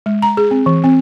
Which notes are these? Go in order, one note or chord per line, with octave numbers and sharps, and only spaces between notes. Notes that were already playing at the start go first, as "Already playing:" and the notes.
G#3
A#5
G#4
C4
E3
C4